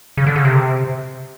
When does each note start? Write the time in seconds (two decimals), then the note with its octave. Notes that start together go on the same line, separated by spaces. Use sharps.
0.17 C#3
0.27 D3
0.36 C#3
0.45 C3